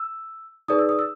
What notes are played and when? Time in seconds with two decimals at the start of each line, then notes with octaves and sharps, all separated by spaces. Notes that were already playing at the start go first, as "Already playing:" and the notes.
Already playing: E6
0.68 D#4 G#4 B4 D5 D#6
0.79 E6
0.89 D#6
0.99 E6